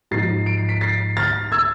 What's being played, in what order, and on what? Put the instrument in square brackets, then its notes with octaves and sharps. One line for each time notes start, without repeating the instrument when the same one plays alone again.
[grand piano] G#2 F3 A6 C7
D7
C7
B6 D7
A6 C7
F6 A6
E6 G#6